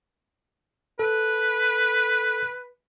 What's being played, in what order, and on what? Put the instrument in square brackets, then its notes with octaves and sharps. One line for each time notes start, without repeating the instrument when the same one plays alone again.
[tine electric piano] A4 [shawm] B4